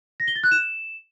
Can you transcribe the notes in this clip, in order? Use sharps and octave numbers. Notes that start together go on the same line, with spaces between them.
A#6
G7
A6
F#6
E7